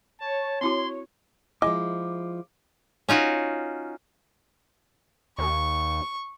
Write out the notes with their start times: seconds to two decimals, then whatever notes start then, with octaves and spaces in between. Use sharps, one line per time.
0.21 C#5 A5
0.61 C4 E4 F#4 C6
1.62 F3 G#3 E4 D#5 G#5 D6
3.09 C#4 D#4 F4 F#4
5.38 D#2 C#6